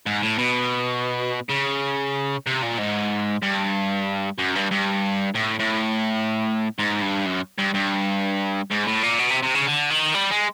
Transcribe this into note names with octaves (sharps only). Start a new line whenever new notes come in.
G#2
A2
B2
C#3
C3
A#2
G#2
G2
F#2
G2
G2
A2
A2
G#2
G2
F#2
G2
G2
G#2
A2
A#2
B2
C3
C3
C#3
D3
D#3
G3
G#3